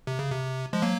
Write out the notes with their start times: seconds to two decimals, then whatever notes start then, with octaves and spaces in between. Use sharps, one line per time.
0.07 C3
0.19 C#3
0.30 C3
0.73 F3 G#3
0.82 F#3 A#3